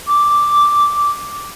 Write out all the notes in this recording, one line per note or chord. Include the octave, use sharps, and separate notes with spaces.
D6